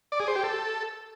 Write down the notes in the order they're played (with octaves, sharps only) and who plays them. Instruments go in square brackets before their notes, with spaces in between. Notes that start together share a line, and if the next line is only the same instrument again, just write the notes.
[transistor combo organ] D5
G#4
C5
G4
A4